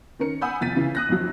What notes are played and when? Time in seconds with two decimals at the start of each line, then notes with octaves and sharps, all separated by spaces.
0.19 D#3 C#4 A#4 C#7
0.41 F#5 G#5 B5 D#6 E6 G6
0.61 C2 F2 A6 B6 D#7
0.76 C#3 E3
0.95 D#6 F#6 A#6
1.08 G#1 F2 F3 F#3